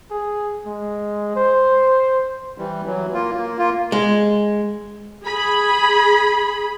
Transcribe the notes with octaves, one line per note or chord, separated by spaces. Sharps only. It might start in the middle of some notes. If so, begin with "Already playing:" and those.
G#4
G#3
C5
E3 G3
E3 F#3
A#3 F4
A#3
A#3 F4
G#3
G#4 B5